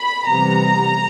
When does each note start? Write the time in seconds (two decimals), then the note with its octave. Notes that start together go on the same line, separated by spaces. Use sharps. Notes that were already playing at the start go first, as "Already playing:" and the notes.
Already playing: B5
0.28 C3 E3 G3 B3 A#5